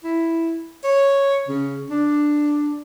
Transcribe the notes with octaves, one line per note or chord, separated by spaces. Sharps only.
E4
C#5
C#3
D4